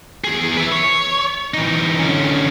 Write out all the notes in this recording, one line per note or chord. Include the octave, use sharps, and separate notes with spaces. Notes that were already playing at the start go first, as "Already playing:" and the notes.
E2 G#4
B4 E5
C#5
E3 D#4
D3 C#4